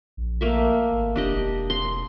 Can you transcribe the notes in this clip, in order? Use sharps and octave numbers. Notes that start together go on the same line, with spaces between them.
A#1
A3 A#3 E5
G#1
E1 D4 G4 D#5
C6